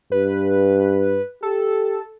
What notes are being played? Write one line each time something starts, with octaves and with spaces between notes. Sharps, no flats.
G2 B4
G4 A4